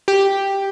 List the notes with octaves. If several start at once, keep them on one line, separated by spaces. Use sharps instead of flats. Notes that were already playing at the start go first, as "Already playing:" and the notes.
G4